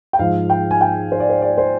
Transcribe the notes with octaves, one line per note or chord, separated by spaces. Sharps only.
G5
G#2 F3 F5
G5
G#5
G5
C5
D5
C5
D5
C5